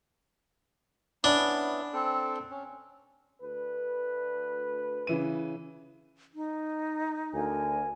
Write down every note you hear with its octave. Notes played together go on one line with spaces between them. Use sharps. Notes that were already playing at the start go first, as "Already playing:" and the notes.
B3 C#4 D4 E4
C4 A4
C#4
D2 B4
C#3 E3 D#7
D#4
D2 A#4 G#5